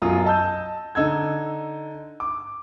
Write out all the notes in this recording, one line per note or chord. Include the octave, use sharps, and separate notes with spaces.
B1 F#2 F#3 F4 A#4 D#6
D#5 A5 E6 G6
D3 D#4 E6 G#6
D6